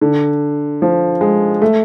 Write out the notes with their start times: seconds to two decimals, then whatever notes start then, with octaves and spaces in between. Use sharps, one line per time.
0.01 D3
0.82 F3
1.21 G#3
1.62 A3